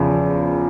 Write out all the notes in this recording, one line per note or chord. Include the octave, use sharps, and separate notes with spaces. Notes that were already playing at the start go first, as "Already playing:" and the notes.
Already playing: E2 C#3 F3